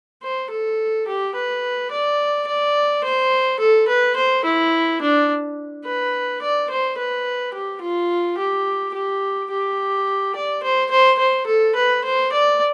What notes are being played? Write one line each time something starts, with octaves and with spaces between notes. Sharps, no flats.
C5
A4
G4
B4
D5
D5
C5
A4
B4
C5
E4
D4
B4
D5
C5
B4
G4
F4
G4
G4
G4
D5
C5
C5
C5
A4
B4
C5
D5